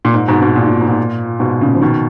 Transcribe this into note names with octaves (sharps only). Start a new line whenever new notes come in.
A#2
G#2
G#2 B2
G#2 B2
A#2
A#2
G#2
A#2
G#2 B2
A#2 C#3
F3
B2 D#3